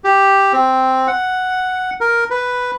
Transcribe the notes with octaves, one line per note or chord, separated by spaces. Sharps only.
G4
C4
F#5
A#4
B4